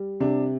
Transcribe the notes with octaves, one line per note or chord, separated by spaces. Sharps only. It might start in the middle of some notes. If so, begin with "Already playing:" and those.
Already playing: G3
C3 D4